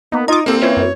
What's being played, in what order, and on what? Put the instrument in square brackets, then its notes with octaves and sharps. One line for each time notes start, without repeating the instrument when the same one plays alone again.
[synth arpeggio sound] A#3 D#4 [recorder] B3
[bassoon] D#4 [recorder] F4 [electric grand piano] A#5 D#6 [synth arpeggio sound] D6 G#6
[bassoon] C2 [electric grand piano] A#3 C4 [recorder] A4
[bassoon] E3 [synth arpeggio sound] C#4 F4 C5 [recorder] C#5
[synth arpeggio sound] F#2